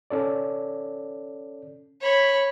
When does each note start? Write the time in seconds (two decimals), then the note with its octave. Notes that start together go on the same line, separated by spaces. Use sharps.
0.10 C#4 A4 D5
2.01 C#5 B5